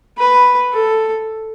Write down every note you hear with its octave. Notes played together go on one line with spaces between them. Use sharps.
B4
A4